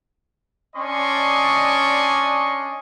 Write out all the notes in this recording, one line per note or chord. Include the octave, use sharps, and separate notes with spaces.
C#4 D4 D5 D#5 C6 C#6